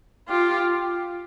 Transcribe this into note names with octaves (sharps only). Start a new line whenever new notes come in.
F4 G4